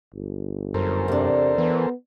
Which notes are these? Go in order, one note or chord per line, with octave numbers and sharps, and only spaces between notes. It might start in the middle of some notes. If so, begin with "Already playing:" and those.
G1
F#2 A4 A#4 C5
E2 C3 D4
E3 B3